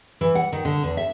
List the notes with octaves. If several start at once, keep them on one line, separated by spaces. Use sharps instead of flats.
E3
F#5
D#3
D3
E2
E5